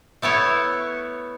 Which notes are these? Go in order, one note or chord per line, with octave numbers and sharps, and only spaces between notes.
A3 B3 E4 C#5